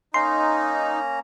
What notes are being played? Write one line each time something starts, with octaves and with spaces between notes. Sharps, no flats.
A#3 C#4 D#4 A#5 C6